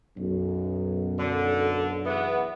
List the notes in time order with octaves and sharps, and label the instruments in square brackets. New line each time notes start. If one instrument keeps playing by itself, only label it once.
[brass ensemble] B1 F#2
[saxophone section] D3
E2 E3 B3